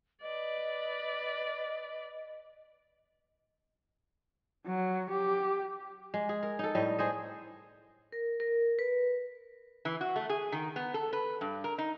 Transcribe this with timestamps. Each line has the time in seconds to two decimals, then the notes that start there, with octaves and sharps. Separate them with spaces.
0.22 B4 D5 D#5
4.66 F#3
5.10 G4
6.14 G#3
6.29 G#4
6.43 A#4
6.59 D#4 A4
6.75 A2 G3 D#5
6.99 G#4 C5 D#5
8.12 A#4
8.40 A#4
8.79 B4
9.85 E3
10.01 F#4
10.16 A3
10.29 G#4
10.52 D#3
10.76 B3
10.94 A4
11.13 B4
11.41 G2
11.64 A#4
11.78 D#4